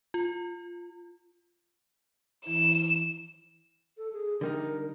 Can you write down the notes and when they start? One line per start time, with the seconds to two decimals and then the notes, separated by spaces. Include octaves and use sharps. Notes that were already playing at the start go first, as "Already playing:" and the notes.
0.14 F4
2.46 E3 E4 E7
3.98 A4
4.13 G#4
4.41 D3 G3 D#4 A#4